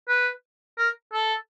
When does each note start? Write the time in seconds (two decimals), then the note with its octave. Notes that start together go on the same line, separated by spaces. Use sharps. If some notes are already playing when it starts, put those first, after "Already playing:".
0.09 B4
0.79 A#4
1.13 A4